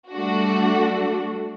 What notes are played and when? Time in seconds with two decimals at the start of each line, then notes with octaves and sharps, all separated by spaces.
0.12 G3 A3 D4 F#4